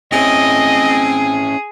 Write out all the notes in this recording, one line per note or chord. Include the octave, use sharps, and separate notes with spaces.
C4 C#4 E4 G#4 D#5